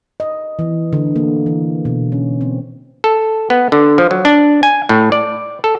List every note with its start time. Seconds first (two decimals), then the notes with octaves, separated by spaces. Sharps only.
0.20 D#5
0.59 E3
0.93 D3
1.16 A#3
1.46 E3
1.85 B2
2.12 C#4
2.41 C4
3.04 A4
3.50 B3
3.72 D3
3.98 F3
4.11 F#3
4.25 D4
4.63 G#5
4.89 A2
5.12 D5
5.64 A4